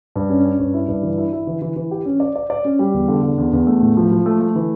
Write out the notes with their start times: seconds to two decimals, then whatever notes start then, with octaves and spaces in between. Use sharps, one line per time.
0.16 G2
0.30 C#4
0.44 C#4
0.59 G2
0.74 E4
0.89 G2
1.03 E3
1.18 E4
1.33 E4
1.47 E3
1.61 E3
1.76 E3
1.91 G4
2.06 C#4
2.20 D5
2.36 D5
2.50 D5
2.65 C#4
2.79 G3
2.94 E2
3.08 D3
3.23 D3
3.38 E2
3.53 E2
3.67 A3
3.82 A2
3.97 F3
4.11 F3
4.26 A3
4.41 A3
4.55 E3